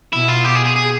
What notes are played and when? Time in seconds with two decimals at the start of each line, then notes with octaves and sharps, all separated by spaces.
0.13 B2 E4
0.28 F4
0.45 G4
0.55 G#4
0.65 G#4
0.76 G#4